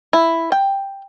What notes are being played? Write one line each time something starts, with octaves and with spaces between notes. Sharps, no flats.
E4
G5